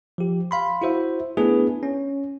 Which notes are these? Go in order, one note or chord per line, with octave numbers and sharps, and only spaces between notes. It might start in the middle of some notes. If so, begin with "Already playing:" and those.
F3 G4
F5 B5 C6
E4 F#4 C5 E5
A3 B3 D4 E4 G#4 B4
C#4